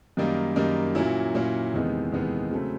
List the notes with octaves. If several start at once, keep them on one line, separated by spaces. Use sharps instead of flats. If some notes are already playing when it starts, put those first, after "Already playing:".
F#2 D#3 G3 A#3 D#4
F#2 D#3 G3 A#3 D#4
A#2 F#3 A#3 C#4 E4
A#2 F#3 A#3 C#4 E4
E2 C3 D#3 G#3 B3
E2 C3 D#3 G#3 B3
C#3 F#3 A3 C4